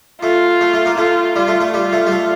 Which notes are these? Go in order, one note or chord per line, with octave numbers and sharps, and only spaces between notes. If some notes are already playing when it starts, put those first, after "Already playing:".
A3 F4
A3
A3
A#3
A3 F4
G3 F4
A3
A3
G3 F4
A3
G3
A3